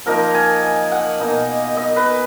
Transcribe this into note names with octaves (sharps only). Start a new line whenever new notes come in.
F3 A#3 D#4 A#4
G#5
G#5
F#5
B2 A#3 D#4
D#5
B4